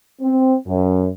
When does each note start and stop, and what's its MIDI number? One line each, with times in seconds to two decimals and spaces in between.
0.21 0.55 60
0.67 1.08 42